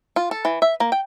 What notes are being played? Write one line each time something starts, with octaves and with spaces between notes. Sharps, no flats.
F4
A4
E3
E5
A#3
G5